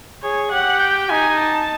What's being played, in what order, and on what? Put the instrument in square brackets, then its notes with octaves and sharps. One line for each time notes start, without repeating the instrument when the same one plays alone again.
[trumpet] G#4 [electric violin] C#5
[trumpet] G4 [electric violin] F#5
[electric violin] G5
[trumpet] D#4 [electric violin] G#5
[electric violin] A5